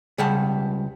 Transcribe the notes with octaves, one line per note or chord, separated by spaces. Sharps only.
C#2 C#3 G3 F#5 A5